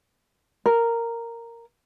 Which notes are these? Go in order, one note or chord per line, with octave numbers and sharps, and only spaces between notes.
A#4